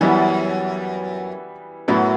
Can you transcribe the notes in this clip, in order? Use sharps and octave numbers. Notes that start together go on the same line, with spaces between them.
F#2 E3 G3 B3 E4
F#2 A2 F#3 B3 E4